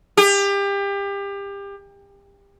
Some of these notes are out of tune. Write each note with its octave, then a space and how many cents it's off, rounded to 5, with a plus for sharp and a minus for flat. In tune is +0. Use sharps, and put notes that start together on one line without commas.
G4 +30